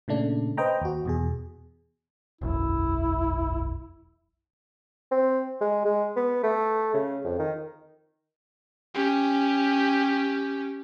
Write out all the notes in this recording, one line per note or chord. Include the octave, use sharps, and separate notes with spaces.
A#2 C#3 A3 D4
B4 C5 D#5 G5 A#5
D#2 F#4
E2 B2 G#4
E1 B1 F#2 E4
C4
G#3
G#3
B3
A3
C#3
F2
D#3
C#4 G4